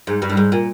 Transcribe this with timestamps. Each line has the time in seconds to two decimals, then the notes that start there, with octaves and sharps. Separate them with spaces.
0.07 G#2
0.22 G2
0.30 A2
0.37 G#2
0.52 A#2